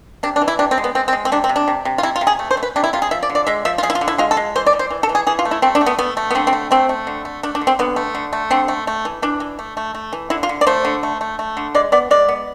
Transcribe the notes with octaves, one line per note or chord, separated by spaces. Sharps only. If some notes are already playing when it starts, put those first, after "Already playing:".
C3 D4
D4
E3
E4
C3 D4
C4
G#3
B3
G#3 C4
C4
G#3
C4
C3 D4
C4
C3
D4
C3
C3
F4
C3 E4
F4
C3
G#4
A3
C5
A3
B4
C3 D4
E4
C3 F4
G#4
F3 E5
D5
D3
D5
G#3 E5
F3 E5
F4
F3 G#4
E4
F4
D3
E4
G#3 F4
A4
G#3
E3 C5
D5
E3
C5
E3
A4
E3
G#4
E3 G#4
F4
A3
E4
A3 C4
D4
A3
B3
A3 B3
A3
B3
D3 C4
C4
A3
A3 C4
A3
D3
A3
A3 D4
D4
D3
C4
D3 B3
A3
D3
A3
D3 C4
A3
A3
E3
E3 D4
E3
A3
A3
A3
E3
D3 E4
F4
D3
D5
A3 C5
D3
A3
A3
A3
D3
G#3 D5
B3 D5
G#3 D5
B3